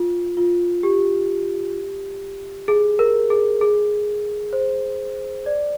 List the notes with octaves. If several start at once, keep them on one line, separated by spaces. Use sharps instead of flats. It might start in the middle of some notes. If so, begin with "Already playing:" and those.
Already playing: F4
F4
G4
G#4
A#4
G#4
G#4
C5
D5